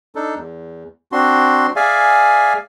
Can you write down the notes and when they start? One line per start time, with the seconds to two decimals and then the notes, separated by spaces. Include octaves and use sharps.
0.15 D4 D#4 A4
0.36 E2
1.12 C4 D4 F#4 C6
1.76 G#4 D5 E5 F5 G#5